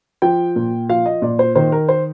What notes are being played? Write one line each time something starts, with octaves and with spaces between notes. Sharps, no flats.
F3 G5
A#2
F3 F5
D#5
A#2 D5
C5
D#3 C5
A#4
C5